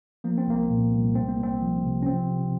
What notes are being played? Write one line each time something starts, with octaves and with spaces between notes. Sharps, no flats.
F3 A#3
C4
C2 A#3
A#2
C2
C2 C4
A#3
C2 C4
F3
C3
C#4
F3 C4
C3